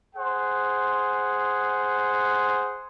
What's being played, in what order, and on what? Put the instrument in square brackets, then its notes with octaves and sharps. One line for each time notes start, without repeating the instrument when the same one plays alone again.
[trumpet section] G#4 C5 F#5